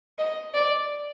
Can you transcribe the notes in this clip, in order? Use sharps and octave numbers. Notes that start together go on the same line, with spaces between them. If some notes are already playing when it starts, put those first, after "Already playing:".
D#5
D5